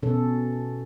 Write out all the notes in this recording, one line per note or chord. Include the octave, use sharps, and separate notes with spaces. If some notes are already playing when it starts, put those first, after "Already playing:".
B2 E3 C#4 A4